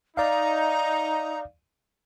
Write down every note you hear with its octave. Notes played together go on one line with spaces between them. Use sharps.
D#4 D5 F5 A#5